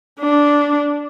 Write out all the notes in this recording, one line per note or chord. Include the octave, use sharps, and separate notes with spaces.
D4